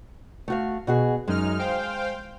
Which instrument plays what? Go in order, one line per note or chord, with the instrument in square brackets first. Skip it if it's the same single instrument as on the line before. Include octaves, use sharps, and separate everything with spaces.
[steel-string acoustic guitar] A3 F#4 F5
B2 F#4 G#4
[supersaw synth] F#2 D#4 F6 [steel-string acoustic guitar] G#3
[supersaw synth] C5 F5 G5